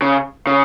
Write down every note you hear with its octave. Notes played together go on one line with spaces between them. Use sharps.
C#3
C#3